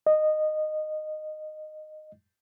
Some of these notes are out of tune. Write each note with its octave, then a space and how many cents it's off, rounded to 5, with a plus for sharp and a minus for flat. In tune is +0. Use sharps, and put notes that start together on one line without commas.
D#5 -15